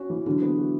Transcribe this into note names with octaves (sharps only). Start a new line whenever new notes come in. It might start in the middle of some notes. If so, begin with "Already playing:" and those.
Already playing: C#4 F#4
E3
D3 F#3
B3
F#4